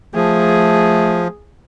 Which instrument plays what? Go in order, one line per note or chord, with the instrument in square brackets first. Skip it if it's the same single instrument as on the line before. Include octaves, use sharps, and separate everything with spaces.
[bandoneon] F3 [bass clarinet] A3 [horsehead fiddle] G#4